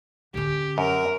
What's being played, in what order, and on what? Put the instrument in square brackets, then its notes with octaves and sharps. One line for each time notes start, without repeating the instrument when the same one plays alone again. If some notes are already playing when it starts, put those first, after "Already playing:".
[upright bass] D3 C#4 [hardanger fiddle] G4
[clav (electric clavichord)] F#2 [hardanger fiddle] A#4